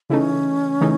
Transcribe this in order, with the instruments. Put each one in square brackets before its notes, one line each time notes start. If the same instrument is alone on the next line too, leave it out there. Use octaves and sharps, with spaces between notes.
[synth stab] C#3 E3 A3 D#4 [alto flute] C#4
[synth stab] C#3 E3 A3 D#4